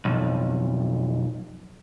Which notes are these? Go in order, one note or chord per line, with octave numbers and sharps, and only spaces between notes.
B1 F2